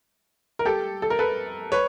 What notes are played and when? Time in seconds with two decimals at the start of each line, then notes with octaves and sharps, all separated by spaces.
0.59 A#4
0.65 G4 A4
1.02 A4
1.10 A#4
1.19 A4 B4
1.72 B4 C#5